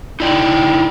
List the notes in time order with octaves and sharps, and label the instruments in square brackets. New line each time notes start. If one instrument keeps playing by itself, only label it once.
[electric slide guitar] D#4 E4 D5 G5